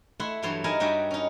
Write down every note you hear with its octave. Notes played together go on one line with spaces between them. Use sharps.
A3 E4 E5 F#5 C6
G2 E3 F#3 A4 C#5 C6
D#4 E4 A#4 G#5 A5
G2 G3 D#4 F#4 E5 G#5
C#4 D#4